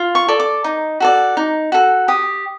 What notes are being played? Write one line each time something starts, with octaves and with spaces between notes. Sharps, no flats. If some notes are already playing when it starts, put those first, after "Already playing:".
Already playing: F4
C#6
A4 D5
D6
D#4
F#4 A4 D5
D#4
F#4 A4
G4 D#6